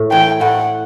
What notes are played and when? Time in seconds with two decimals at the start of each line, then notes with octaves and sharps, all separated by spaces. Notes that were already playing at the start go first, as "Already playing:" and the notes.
Already playing: A2
0.12 E3 G5
0.41 A2 F#5